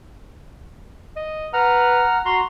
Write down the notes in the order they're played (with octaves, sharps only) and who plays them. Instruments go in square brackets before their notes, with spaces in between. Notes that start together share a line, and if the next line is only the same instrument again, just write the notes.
[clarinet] D#5
[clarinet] B4 [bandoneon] F#5 A#5 F6
[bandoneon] F#4 A#5 [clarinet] C6